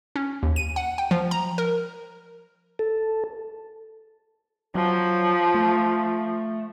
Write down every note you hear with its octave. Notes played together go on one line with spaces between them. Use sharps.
C#4
D#2
D#7
F#5
G5
F3
A#5
A#4
A4
F3 F#3
A3